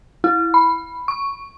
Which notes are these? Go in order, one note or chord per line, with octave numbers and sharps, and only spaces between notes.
E4
B5
C#6